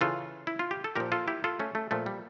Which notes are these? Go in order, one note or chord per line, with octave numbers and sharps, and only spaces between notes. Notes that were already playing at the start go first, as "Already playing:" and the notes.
C#3 E3 F4 A4
E4
F4
G4
A4
A#2 F3 G4 A#4
F4 A4
E4 G4
F4 A4
A3 C#4
A3
A#2 F3 A3
G3